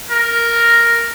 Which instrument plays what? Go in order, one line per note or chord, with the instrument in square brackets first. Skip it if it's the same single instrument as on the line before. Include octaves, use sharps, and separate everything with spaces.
[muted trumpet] A#4